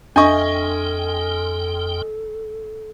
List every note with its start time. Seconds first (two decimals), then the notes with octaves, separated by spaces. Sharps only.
0.16 F2 D4 A4 D#5 E5 G5 G#5 C#6